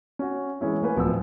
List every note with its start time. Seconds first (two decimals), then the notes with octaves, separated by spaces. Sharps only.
0.19 C#4 F#4
0.61 E3 G#3 C#4 E4
0.82 A3 A#3 B4 G#5
0.96 D1 F3 A#3 B3 E6